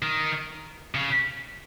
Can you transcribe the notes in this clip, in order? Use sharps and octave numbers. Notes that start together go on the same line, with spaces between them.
D#3
C#3